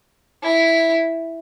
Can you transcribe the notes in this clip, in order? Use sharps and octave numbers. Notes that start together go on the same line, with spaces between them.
E4